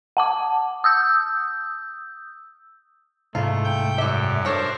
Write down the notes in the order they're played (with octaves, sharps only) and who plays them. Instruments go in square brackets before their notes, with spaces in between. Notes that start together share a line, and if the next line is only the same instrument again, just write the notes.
[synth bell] F#5 A5 D6
D#6 E6 G6
[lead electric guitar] C2 G#2 [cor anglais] A3 [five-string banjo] F4
[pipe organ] G5 G6
[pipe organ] F#2 [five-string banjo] E4 E5 [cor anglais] D5
[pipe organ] D4 A#4 C5 [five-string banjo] A4 C#5